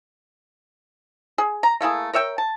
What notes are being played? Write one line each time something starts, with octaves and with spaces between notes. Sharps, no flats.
G#4
A#5
A3 A#3 E4 G#4
A#4 C#5 E5 G5
A5